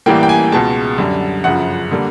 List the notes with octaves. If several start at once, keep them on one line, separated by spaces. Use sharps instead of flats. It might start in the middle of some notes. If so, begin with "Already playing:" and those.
A1 A2 E3 G3 A#3 G5
G5
G#5
C#2 B2 G#3 A5
F#2 D3 G3
G1 F#2 C#3 F3 F#5
D3 G3 A#3